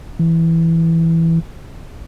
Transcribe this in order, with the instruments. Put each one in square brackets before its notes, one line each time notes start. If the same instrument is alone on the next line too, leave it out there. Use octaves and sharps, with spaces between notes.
[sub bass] E3